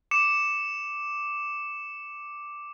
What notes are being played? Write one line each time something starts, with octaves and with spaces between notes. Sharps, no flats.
D6 C#7 E7